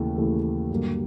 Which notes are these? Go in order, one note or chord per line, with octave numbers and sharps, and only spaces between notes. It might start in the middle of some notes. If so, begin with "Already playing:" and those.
Already playing: D#2 C#3 E3 A3
D#2 C#3 E3 A3
G2 D3 F#3 A#3